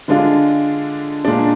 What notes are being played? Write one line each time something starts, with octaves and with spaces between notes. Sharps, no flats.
D3 G#3 D4 F4
A#2 G#3 D4